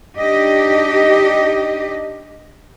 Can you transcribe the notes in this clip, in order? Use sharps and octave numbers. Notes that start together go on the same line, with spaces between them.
D4 D#4 G4 D#5